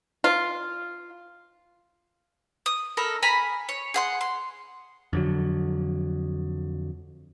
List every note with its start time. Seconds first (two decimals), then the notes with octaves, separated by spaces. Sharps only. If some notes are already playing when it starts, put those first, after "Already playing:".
0.24 F4
2.66 D#6
2.97 D#4 A4 A#4 B5
3.23 G#5 A#5 B5
3.69 C#5
3.94 G#4 F#5 C6
4.21 C6
5.13 F2 D3 F#3